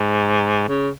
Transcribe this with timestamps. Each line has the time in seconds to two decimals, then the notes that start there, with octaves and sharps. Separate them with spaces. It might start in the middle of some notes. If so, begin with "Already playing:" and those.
Already playing: G#2
0.68 C#3